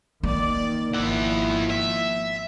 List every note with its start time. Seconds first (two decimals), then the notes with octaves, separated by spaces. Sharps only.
0.23 D#3 A#3 D5
0.95 G#1 D#3 F3 E4 F#5
1.70 E5